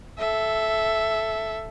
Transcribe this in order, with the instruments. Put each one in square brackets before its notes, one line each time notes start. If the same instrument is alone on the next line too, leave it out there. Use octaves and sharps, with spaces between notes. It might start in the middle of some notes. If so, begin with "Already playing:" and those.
[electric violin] A4 E5